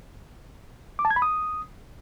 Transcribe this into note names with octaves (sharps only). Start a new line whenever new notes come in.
D6
A5
G#6
B5
D#6